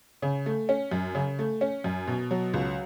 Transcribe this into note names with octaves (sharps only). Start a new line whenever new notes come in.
C#3
A3
C#4
F#2
C#3
A3
C#4
F#2
B2
F#3
C#2